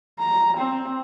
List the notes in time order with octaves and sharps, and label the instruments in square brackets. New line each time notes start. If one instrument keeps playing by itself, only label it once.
[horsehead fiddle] A#5
C4